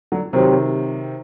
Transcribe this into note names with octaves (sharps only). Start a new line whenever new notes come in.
D3 F#3
C3 D#3 F#3 C4 G4 C5